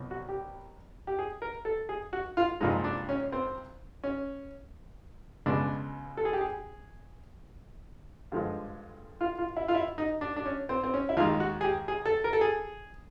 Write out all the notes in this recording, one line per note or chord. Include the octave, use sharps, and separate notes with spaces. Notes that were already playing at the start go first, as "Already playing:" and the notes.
Already playing: C2 B2 F#3
F#4
G4
G4
G#4
A#4
A4
G#4
F#4
F4
C2 A#2 F3 G#3 D#4
D4
C#4
C4
C#4
C#2 B2 G#3 D4
A4
G#4
G4
G#4
G2 D3 F3 G#3
F4
F4
E4
F4
E4
D#4
D4
D4
C#4
C4
C4
C#4
E4
D#2 D#3 G#3 F4
F#4
G#4
G4
G#4
A4
A#4
A4
G#4